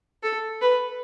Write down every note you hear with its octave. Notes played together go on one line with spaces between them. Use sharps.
A4
B4